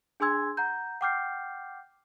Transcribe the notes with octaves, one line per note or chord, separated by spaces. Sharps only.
D4 G#4 G#5 C6 E6 G#6
F#5 A#5 G6
F#5 G5 D6 F6 G6 C7